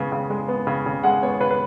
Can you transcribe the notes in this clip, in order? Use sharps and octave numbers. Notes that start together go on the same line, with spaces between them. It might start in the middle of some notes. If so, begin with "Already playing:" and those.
Already playing: C#3 G#3 B3
C#3
G#3
B3
C#3
C#3
G#3 F#5
B3 C#5
C#3 B4
B4